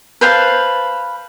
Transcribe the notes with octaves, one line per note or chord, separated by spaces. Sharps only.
B4 C5 F5 A5